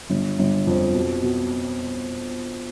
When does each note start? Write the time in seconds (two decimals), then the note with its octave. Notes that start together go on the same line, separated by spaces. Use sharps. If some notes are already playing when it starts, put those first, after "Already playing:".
0.10 G1
0.39 G1
0.67 F2
0.94 B2
1.23 B2